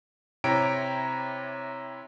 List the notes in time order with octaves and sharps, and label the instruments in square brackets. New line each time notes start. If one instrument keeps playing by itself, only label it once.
[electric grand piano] C3 E4 C#5 G5 A#5 D7